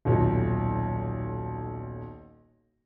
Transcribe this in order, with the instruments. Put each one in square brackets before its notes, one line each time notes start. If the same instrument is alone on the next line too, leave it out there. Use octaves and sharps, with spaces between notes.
[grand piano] D#1 B1